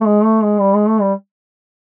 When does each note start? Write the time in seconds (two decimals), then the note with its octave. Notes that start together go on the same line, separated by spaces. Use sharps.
0.01 A3
0.05 G#3
0.24 A3
0.42 G#3
0.60 G3
0.74 G#3
0.88 A3
1.01 G3